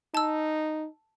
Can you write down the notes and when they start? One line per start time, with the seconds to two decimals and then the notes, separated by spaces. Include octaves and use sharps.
0.15 D#4 A5 E6